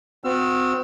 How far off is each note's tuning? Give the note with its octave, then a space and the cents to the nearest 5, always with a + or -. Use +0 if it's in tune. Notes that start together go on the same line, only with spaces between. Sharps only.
C4 -30 F#4 -30 E6 +40